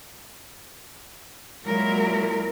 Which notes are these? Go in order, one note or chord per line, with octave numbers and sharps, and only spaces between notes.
A#2 F#3 G#3 E4 A#4